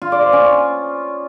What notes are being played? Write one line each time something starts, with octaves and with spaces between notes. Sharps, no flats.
F4
D5
C5
C#4